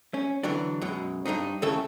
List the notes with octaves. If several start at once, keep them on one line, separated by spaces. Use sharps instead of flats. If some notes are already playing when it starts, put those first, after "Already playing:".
C#4
D3 E3 F#3 D4
F#2 B2 F#3 G#3
G2 B2 D4 D#4
D#2 A2 C#3 E4 A4 A5